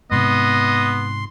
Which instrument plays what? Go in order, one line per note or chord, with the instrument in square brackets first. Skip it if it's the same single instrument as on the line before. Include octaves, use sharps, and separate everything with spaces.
[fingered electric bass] G#2 C3 [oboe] B3 [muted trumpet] D#5 [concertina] C6